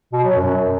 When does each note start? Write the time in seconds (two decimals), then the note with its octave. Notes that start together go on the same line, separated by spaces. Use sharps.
0.13 B2
0.24 F#3
0.36 F#2